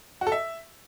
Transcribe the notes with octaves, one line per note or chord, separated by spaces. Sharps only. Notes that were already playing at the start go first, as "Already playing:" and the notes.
F#4
A4
E5